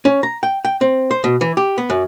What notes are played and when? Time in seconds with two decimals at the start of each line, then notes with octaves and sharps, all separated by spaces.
0.05 C#4
0.23 A#5
0.43 G5
0.65 G5
0.81 C4
1.11 C5
1.24 B2
1.41 E3
1.57 G4
1.78 B3
1.90 F#2